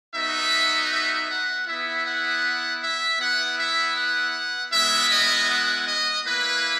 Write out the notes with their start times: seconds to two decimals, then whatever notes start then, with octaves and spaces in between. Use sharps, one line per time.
0.14 B3 D#4 F#4 E5
0.91 E5
1.29 F#5
1.67 B3 E4 E5
2.06 F#5
2.82 E5
3.20 B3 E4 F#5
3.59 E5
3.96 F#5
4.72 G#3 B3 E4 E5
5.11 D#5
5.49 F#5
5.87 D#5
6.26 A#3 E4 B4